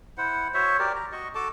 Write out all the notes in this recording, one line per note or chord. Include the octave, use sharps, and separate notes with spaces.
E4 C5 F#5
F#4 C5 C#5 E5
G4 A#4 D5
A#5
F#4 D#5 C#6
F#4 A4 A5 D6